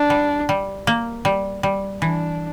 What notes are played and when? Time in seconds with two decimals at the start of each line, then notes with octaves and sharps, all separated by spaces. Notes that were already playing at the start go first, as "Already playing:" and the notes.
Already playing: D4
0.10 G3
0.49 G3
0.87 A#3
1.25 G3
1.63 G3
2.02 E3 D4